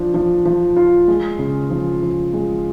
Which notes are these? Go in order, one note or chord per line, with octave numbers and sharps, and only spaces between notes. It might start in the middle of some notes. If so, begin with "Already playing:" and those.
Already playing: F3 D4
F3
F3
F4
G#3
C#3
F3
F3
G#3